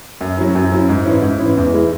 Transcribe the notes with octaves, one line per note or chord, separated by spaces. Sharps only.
F#2
F#3 C#4 E4
F#2
F#3 C#4 E4
G#2
E3 C#4 E4
G#2
E3 C#4 E4
E2
E3 G#3 E4